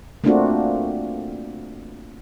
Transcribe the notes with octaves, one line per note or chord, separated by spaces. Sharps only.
A3 A#3 C4 D4 F4 F#4